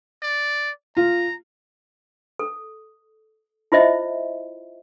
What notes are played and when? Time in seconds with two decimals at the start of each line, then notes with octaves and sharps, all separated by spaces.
0.23 D5
0.97 F4 A#5
2.39 A4
3.72 E4 F4 C5 D#5 E5